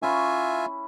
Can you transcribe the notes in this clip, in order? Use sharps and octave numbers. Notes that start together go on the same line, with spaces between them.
C#4 E4 F4 E5 G#5